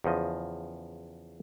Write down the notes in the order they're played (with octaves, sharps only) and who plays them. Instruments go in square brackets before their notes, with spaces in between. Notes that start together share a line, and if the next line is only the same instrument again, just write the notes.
[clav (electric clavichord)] E2 C#3 F3 D#5